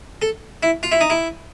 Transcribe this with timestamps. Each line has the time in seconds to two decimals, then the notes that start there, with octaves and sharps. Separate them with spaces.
0.22 A4
0.63 E4
0.83 F4
0.92 E4
1.01 D#4
1.10 E4